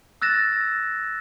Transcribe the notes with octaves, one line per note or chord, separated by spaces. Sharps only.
E6 F#6 A6 A#6 E7